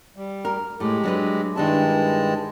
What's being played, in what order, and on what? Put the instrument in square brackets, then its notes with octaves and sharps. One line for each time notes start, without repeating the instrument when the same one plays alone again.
[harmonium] G3
[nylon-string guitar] A#4
[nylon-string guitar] A2 [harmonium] G#3 G4
[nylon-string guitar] F#3 D4 B4
[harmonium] G2 G#3 A5 [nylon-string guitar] D#3 D4 E4